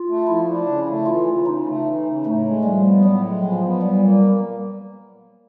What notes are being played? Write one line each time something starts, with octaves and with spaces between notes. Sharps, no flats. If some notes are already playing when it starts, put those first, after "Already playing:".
Already playing: F4
A3
F3 E4
D4
C#3
A3
E3 F4
C#3
C#3 D#4
A3
E3
C#3
A2 A3
G#3
F3 G3
B3
A2 F#3
G#3
F3
B3
A#2 G3
A#3